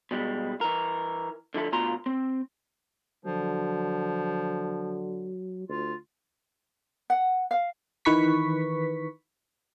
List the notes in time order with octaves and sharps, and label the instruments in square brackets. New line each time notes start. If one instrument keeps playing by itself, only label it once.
[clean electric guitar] B2 G3 G#3
E3 A#4
D3 F3 E4 A4
D2 B2 F4 A#5 C6
C4
[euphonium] D3 [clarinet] F3 [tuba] F#3
[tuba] D2 [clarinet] F4
[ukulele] F#5
F5
[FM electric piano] D#3 E3 B4 C#6 B6